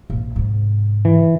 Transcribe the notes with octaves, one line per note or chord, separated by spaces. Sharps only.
A#1
G#2 C3
E3